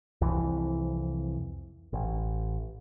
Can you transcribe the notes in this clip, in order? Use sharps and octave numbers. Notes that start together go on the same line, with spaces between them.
C2 F2 E3
A1